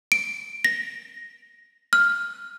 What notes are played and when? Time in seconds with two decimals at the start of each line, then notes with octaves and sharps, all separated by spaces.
0.12 D7
0.65 A#6
1.93 F6